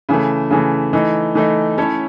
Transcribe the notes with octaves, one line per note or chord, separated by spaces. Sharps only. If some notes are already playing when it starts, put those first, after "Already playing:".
C#3 E3 A3
C#3 E3 A3
E3 A3 D#4
E3 A3 D#4
A3 C#4 E4 A4 C#5